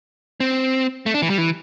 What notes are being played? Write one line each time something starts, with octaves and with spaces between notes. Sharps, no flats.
C4
A3
D4
E3
G3
E3